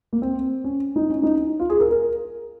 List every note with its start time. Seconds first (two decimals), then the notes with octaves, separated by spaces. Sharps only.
0.13 A#3
0.22 C4
0.64 C#4
0.96 D#4
1.10 C#4
1.23 D#4
1.60 F4
1.70 G#4
1.80 A#4
1.90 A#4